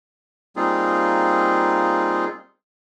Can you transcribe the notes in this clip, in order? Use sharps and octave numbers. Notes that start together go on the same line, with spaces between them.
G3 A#3 C4 D#4 F4 G#4